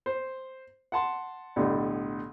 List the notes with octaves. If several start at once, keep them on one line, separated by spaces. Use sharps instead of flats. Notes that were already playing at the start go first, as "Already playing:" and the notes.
C5
F#5 A5 C6
B1 A2 D3 G3